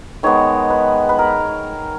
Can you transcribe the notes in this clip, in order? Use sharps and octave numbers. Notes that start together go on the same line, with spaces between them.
D#3 G#3 B3 C#5
B4
B4
A#4